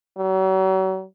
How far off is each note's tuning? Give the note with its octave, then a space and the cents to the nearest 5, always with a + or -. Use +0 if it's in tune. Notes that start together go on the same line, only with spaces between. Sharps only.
F#3 +40